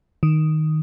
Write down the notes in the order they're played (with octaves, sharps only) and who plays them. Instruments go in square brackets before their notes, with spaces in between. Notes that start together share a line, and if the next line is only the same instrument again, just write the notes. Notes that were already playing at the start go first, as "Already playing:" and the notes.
[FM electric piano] D#3